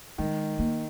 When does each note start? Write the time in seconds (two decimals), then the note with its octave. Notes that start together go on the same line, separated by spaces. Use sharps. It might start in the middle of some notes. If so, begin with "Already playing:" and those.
0.18 D#3 G#3
0.59 A#3